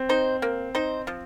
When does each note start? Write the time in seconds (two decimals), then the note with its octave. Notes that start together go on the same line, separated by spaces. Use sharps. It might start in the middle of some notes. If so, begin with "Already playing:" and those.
Already playing: C4
0.09 D#4 C5
0.42 A#3
0.75 D#4 C5
1.07 F3